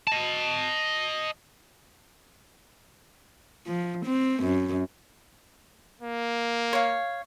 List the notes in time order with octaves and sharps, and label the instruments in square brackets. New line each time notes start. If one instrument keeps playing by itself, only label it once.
[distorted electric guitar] D#5 A5
[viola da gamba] F3
C4
F#2
[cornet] A#3
[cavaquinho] C#5 F5